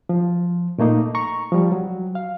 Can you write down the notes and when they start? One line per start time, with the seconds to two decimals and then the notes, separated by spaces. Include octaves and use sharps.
0.09 F3
0.78 A#2 A3 A#3 D#4
1.15 A#5 C#6
1.52 F3 G3
1.72 F#3
2.15 F5